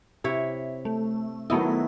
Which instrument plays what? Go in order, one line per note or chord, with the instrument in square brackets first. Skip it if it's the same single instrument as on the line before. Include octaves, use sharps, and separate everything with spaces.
[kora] C3 E4 C#5
[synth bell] A3
[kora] D#3 F#3 D#5 [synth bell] A3 B3 E4